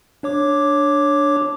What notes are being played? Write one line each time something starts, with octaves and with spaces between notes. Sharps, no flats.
D4 C#5 D6